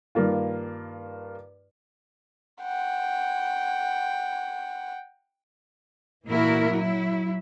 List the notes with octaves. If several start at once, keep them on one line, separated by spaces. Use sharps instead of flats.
G2 D#3 A#3 F4
F#5 G5
A#2 E3 A#3 E4 F#4 A#4
F#3 E4